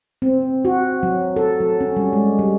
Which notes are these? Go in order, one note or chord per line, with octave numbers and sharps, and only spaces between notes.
C4
F#4
F#3
A4
F#3
C#4
G3
G#3
G3